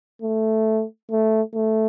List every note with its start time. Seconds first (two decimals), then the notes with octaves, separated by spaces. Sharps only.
0.22 A3
1.11 A3
1.55 A3